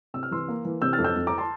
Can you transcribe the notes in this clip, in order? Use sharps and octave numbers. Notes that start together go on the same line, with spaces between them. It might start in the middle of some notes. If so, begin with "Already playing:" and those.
C3 E6
F6
E3 C6 E6
A#3
E3
C3 E6 G6
F6 A6
F2
E6 G6
F2
A#5 D6
A5 C6